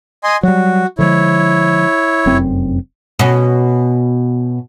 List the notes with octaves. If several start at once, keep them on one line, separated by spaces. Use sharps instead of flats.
D#5 G#5 C6
F#3 G3 F#4
D3 F3 G#3 E4 C#5
F1 F#2 C4
B2 C#4